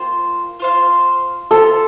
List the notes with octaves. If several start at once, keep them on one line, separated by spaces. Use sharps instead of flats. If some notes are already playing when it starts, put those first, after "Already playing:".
Already playing: A#3 F4 C5 G5
F4 C5 F5
F4 A4 C5 F5